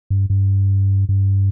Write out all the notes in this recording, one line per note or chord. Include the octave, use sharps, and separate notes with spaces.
G2
G2
G2